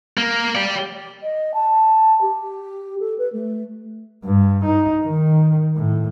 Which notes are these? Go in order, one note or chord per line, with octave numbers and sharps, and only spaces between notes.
A#3
G4 D5
D#5
A5
G4
A4
B4
A3
G2
D#4
D#3
A2